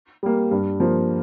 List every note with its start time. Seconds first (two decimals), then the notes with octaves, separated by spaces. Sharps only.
0.23 G3 A#3
0.51 G2
0.80 F3 A#3